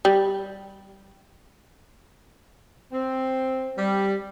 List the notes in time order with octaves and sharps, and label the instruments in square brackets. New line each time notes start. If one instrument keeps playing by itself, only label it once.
[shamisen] G3
[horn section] C4
G3